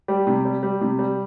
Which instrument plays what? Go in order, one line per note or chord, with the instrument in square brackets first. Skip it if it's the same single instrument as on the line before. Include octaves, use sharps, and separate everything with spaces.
[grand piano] G3 G4
C3
G3
G3
C3
G3